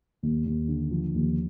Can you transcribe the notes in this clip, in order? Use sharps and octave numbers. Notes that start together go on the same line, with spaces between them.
D#2
D#2
D3
F3
D#2